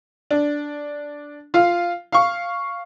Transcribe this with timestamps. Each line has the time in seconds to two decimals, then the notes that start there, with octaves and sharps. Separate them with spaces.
0.31 D4
1.54 F4 F5
2.12 F5 C#6